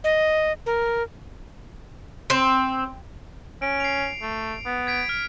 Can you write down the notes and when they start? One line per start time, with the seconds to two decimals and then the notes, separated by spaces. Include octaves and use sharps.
0.04 D#5
0.66 A#4
2.30 C4
3.62 C#4 D7
3.80 C7 D7 F7
4.22 A3
4.66 B3
4.87 G#6 B6 D7
5.09 F6